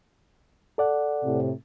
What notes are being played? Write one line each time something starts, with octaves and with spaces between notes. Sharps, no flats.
A4 D5 F#5
A2 C3